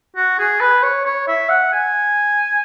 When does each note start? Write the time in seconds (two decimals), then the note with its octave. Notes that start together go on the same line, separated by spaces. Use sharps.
0.16 F#4
0.39 G#4
0.60 B4
0.83 C#5
1.05 C#5
1.28 E5
1.49 F#5
1.72 G#5